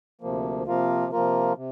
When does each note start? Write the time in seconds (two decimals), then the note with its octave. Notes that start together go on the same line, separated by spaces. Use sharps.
0.21 D2 C3 F3 A#3
0.66 C3 F3 A#3 F4 A#4
1.12 C3 F3 A#3 F4 A#4
1.56 C3